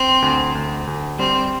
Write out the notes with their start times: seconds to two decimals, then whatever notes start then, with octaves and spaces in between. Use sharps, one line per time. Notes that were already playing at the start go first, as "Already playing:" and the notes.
Already playing: C4
0.22 D2
0.55 D2
0.87 D2
1.19 G3 C4